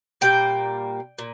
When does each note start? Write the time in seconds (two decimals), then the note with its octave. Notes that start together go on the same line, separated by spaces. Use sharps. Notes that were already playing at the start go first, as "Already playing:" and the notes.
0.21 A#2 G3 A#3 G5
1.18 A#2